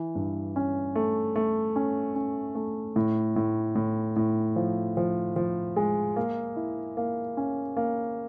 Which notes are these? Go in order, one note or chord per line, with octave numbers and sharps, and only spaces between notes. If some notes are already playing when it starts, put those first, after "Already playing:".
Already playing: E3
G2
C#4
A3
A3
C#4
C#4
A3
A2
A2
A2
A2
F3
F3
F3
G#3
A#3
E4
A#3
C#4
A#3